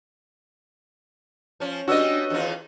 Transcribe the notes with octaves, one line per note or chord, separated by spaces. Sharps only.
F3 C#4
G3 B3 C#4 D4 F#4 D#5 E6
E2 D#3 F4